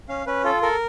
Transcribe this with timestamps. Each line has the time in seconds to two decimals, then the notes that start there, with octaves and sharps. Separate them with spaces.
0.09 C#4 F5
0.26 C#4 B4
0.44 F4 A4
0.62 A4 A#4